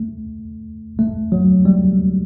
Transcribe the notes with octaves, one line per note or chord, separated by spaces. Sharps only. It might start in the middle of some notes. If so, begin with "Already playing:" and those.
Already playing: A3
A3
F#3
G3